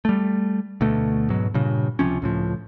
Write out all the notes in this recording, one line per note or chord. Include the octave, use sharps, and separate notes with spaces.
G3 A3
D2 B2 A3
G#2 B2 F#3
G2 A#2 C#3
C#2 C3 F3 C#4
C#2 A2 F3